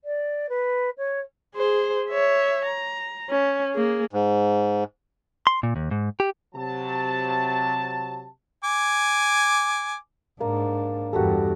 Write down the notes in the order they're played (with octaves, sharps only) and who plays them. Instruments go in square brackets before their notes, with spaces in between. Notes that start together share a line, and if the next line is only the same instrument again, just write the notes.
[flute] D5
B4
C#5
[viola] G#4 C5
C#5 E5
A#5
C#4
A#3 G#4
[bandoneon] G#2
[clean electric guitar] C6
A#2
D#2
G#2
G4
[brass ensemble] C3 F#3 A5
[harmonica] G#5 D6
[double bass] G#2 D4 [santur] A#3
[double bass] E2 G2 [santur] F#4 G4 A4